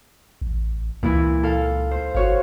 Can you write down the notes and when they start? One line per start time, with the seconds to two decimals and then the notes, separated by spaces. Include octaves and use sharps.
0.41 A1
1.03 C#2 A#2 E3 E4
1.43 A4 F5
1.91 C5
2.15 G1 F#4 C#5 F5